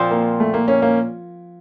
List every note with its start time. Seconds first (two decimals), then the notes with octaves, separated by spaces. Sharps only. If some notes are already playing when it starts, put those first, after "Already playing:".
Already playing: A#2 F3 C4
0.11 A#3
0.40 A3
0.54 A#3
0.68 A#3 C#4
0.82 A#3 C#4